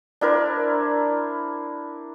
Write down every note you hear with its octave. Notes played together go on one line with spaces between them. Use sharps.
D4 E4 A#4 C5